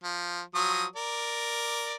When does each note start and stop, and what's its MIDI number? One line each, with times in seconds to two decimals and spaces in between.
0.04 0.41 53
0.55 0.85 53
0.55 0.85 54
0.55 0.85 87
0.96 1.95 70
0.96 1.95 74